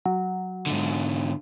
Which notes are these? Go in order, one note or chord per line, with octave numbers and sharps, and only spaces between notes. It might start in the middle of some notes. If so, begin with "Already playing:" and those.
F#3
G#2 D3